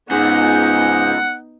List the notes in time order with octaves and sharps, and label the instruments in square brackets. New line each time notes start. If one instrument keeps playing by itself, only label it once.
[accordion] G#2 G#4 G6 [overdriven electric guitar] C#3 G#3 [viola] B3 D#4 [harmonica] F#5